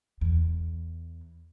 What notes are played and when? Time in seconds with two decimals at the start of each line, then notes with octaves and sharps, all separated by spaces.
0.21 E2